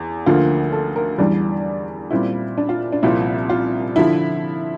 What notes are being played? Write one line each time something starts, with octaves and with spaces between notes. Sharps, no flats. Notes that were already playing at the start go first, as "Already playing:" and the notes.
Already playing: E2
D2 D3 F3 A#3 F4
A4
A#4
E2 E3 G3 D4
A#2 G3 C4 E4
D4
F4
D4
C2 A#2 F3 C4 E4
F4
D3 F3 E4